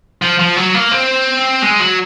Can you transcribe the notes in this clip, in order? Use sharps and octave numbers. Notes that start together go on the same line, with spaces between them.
F3
F3
F#3
A#3
C4
G#3
F#3